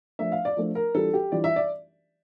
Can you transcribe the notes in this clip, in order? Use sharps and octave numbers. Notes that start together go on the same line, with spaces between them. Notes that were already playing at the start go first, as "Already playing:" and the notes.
F3 A3 D4 E5
F5
D5
F3 A3 D4
A#4
E3 G3 D4 F4 A4
G4
E3 G3 D4 F4 D5
E5
D5